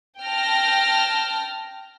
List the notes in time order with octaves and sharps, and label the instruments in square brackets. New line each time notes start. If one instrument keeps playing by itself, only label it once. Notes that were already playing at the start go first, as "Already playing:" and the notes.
[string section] G5 A5 F6 A#6